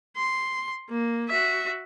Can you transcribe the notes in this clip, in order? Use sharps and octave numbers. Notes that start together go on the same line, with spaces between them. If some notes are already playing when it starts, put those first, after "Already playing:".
C6
A#3
F#4 E5